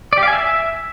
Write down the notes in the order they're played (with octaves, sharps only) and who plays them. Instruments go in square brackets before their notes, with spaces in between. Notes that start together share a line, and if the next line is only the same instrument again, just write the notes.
[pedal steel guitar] D5
G4
F5
G#5
E5